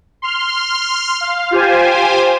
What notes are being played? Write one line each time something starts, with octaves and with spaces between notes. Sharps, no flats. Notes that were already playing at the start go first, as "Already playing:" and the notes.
C6 F6
F5
F4 G4 C5 G#5